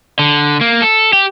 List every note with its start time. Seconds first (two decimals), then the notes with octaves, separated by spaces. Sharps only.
0.19 D3
0.61 A#3
0.82 A4
1.13 G4